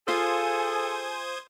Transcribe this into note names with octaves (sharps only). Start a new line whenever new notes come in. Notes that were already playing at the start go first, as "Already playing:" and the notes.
F4 G#4 A4 C5 F5 G#5 D#6 G#6